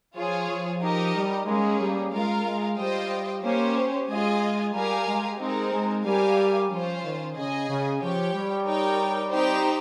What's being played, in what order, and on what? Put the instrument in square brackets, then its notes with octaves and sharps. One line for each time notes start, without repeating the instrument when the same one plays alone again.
[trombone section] F3 [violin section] F4 G#4 C#5
[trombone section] F3
[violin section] D#4 G4 A#4 D#5
[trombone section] G3
[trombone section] G#3 [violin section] A#3 C#4 G#4
[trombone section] G3
[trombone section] G#3 [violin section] F4 A#4 F5
[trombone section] G#3
[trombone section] G3 [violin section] F4 C5 D#5 G5
[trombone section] A#3 [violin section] C#4 G4 C5
[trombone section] G#3 [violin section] F4 G#4 D#5 G#5
[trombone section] G3 [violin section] G4 A#4 F5 G#5
[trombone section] G#3
[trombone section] G#3 [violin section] C4 D#4 A#4
[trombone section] G#3
[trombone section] G3 [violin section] G4 A#4 F5 G#5
[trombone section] F3 [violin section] C#4 F4 C5
[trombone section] D#3
[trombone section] C#3 [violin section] G#4 D#5 G#5
[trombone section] C#3
[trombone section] F3 [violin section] G4 C#5 G5
[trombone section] G3
[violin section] D#4 A#4 C#5 G5
C4 D#4 G4 C5 G5